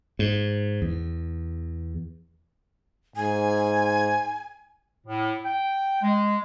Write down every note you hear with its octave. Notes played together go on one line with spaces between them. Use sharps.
G#2
E2
G#2 G#5
A2
G5
G#3